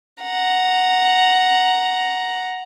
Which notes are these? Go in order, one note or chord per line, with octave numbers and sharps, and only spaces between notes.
F#5 A#5